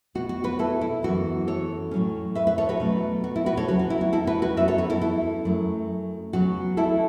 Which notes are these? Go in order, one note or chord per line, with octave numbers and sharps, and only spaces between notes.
B2 B3 F#4
F#4
F#4 B4
E4 A4
E4
F#2 E3 B3 F#4
A4 C#5
A2 F#3 C#4
B4 E5
B4 E5
A4 C#5
F#4 B4
B2 F#3 A3 C#4
F#4
E4 A4
F#4 B4
A4 C#5
C#3 F#3 B3 F#4 B4
F#4
E4
F#4
E4 A4
F#4 B4
F#4 B4
F#2 F#3 B3 B4 E5
A4 C#5
F#4 B4
E4 A4
E4 A4
F#2 F#3 A3
C#3 F#3 B3 F#4
E4 A4